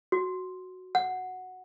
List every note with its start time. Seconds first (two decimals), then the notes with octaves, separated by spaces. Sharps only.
0.12 F#4
0.95 F#5